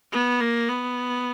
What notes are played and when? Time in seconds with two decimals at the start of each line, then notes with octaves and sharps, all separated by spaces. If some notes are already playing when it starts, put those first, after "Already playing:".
0.12 B3
0.40 A#3
0.69 B3